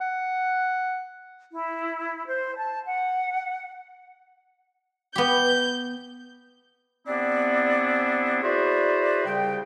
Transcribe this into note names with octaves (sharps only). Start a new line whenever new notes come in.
F#5
E4
C5
A5
F#5
B3 G4 G6
C3 B3 C4 D4 E4 D5
E4 F#4 G#4 B4 C5 D5
C2 C#3 G3 G5